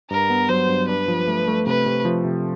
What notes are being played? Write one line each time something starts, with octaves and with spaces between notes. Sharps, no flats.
G2 A#4
B3
F#3 C5
G2
D4 B4
F3
A3
A3
C3 B4
C3
F3
C3